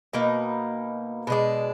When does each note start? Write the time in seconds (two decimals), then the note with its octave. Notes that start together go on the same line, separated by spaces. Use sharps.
0.13 B2 A#3 D#4
1.27 B2 G#3 D4